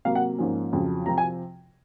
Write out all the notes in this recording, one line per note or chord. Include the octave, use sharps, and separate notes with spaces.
C3 F#3 A#3 F5
F#5
G#2 F3 A#3 C#4
F2 C#3 F#3
C3 F3 C4 A#5
G#5